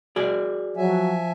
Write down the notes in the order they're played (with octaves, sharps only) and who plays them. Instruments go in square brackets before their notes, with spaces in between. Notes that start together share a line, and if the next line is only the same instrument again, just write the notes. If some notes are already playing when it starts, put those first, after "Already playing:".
[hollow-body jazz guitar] F#4 G#4 D5
[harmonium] F3 E5 G#5 [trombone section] F#3